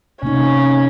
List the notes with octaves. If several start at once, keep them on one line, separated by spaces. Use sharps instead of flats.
C3 A#3 C#4 D#4